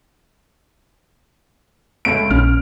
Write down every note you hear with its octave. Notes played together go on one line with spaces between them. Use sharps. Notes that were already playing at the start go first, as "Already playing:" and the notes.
C#2 A3 D7
A#1 C#4 F6